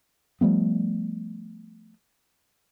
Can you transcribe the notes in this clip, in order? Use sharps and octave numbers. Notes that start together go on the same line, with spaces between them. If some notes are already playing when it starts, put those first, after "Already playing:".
F3 G3 A3 B3